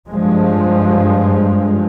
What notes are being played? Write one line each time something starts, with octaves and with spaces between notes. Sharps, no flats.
G2 F3 G#3